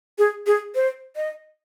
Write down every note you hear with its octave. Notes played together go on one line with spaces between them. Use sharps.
G#4
G#4
C5
D#5